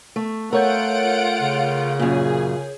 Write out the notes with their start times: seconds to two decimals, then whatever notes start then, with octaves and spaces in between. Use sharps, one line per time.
0.16 A3
0.53 A3 F4 A#4 C#5 F#5 G6 D7
1.40 C#3
1.99 F#2 A#2 G#4